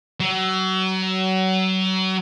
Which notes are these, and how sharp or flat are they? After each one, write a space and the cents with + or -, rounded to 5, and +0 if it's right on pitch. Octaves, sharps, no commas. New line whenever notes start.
F#3 +30